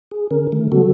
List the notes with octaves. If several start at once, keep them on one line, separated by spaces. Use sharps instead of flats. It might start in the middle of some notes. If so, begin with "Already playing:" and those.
G#4
D3 C#4 A#4
D3 D#3 A3
C#3 F#3 G3 B3 F#4 A4